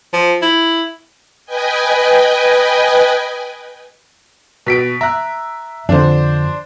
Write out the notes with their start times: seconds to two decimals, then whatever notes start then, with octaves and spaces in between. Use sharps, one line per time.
0.13 F3
0.42 E4
1.46 B4 D#5 G5 G#5
4.66 B2 B6 D7
5.01 E5 A#5 F#6
5.89 F2 D3 D4 C5